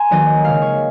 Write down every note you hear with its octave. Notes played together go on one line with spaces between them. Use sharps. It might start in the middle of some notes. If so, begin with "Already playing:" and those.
Already playing: G#5 A#5 C6
D#3 F#3 A#3 D#5
C#3 G#3 F5
C#5